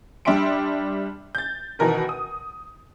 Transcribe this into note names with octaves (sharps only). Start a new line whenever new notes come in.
G3 D4 G4 E5 C6 D7
G6 A6
B2 D#3 E3 A#4 B4
D#6